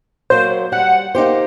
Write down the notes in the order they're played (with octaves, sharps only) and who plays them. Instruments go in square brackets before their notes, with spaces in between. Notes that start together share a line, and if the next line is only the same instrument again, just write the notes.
[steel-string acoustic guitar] F#3 A#3 [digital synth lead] C5
[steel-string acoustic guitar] G3 [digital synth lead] F#5
[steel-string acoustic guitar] A#3 D#4 G4 C5